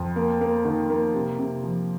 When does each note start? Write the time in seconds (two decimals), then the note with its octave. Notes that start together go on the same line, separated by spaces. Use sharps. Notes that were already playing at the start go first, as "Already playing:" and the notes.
Already playing: F2
0.16 A#3
0.41 A#3
0.65 D#3
0.90 A#3
1.14 C3
1.39 C3
1.64 F3